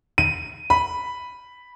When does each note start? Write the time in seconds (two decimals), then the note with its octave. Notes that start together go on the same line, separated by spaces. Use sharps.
0.18 D#7
0.70 B5